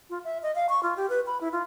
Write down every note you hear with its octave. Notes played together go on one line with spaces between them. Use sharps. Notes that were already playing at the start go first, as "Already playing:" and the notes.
F4
E5
D#5
F5
C#6
F4
G4
B4
B5
E4
F4